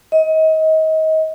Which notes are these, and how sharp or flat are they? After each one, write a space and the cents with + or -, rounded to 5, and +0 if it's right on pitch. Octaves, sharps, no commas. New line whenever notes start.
D#5 +30